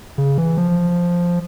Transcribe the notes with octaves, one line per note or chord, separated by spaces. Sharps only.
C#3
E3
F3